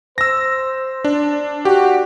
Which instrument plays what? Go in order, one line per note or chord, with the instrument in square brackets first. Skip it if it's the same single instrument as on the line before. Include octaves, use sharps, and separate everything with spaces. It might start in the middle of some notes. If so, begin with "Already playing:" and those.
[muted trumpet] C5 [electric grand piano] E6 A#6
[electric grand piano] D4
[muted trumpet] F#4 [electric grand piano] G4